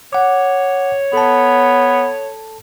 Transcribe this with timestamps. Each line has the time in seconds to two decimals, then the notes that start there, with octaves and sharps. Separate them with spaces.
0.13 C#5 F#5 D6
1.13 B3 A4 A5